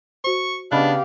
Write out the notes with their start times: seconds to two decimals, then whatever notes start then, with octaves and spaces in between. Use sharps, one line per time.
0.24 F#4 C5 C#6
0.71 C#3 B3 D4 G4 D#5 F5 B5 F#6